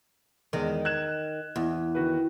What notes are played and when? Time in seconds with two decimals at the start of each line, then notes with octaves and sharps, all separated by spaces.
0.53 E2 D#3 G#3
0.85 F#6 G#6 E7
1.56 E2
1.95 D#3 F#4 B4